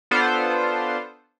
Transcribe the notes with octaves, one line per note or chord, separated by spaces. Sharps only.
B3 D4 F4 A4 C5